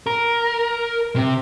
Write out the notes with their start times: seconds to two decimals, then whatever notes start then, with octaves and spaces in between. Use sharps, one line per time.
0.06 A#4
1.16 C3